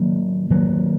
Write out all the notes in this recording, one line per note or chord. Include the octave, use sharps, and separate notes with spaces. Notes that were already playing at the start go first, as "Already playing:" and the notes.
Already playing: D#3 F#3 A#3
D#3 F#3 A#3